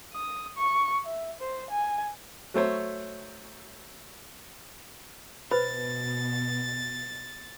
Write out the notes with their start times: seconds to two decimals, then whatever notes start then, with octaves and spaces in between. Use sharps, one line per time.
0.13 D#6
0.57 C#6
1.05 E5
1.40 C5
1.70 G#5
2.54 F#3 A3 C5 C#5
5.51 B2 B4 C5 B5 A6